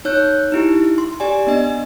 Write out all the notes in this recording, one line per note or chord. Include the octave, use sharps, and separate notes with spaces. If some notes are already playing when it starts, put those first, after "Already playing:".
D#4 C#5 F#6 G6
D#4 E4 G4
C6
G4 D5 G#5
B3 D4 D#5